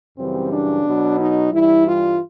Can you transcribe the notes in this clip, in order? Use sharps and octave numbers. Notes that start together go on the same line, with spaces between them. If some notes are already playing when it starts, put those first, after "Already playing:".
F#2 C#3 E3 G3 C4
D4
B2 F#3
D#4
G2 E3 G3 E4
F4